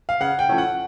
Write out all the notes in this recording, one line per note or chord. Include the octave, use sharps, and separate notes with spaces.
F5
C#3 F#5
G5
F3 A3 C#4 E4
F#5